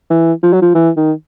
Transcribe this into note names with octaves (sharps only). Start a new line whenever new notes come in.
E3
F3
F#3
F3
E3
D#3